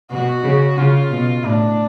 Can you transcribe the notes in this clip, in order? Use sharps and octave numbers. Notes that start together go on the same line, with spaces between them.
B2 F#4
C#3
C#3 F4
B2
A2 D4